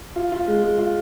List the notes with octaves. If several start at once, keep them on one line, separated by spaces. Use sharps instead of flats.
F4
F4
G#3
G#3
F4